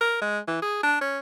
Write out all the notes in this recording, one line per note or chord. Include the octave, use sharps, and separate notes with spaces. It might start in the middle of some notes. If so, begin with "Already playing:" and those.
A#4
G#3
E3
G#4
D4
C#4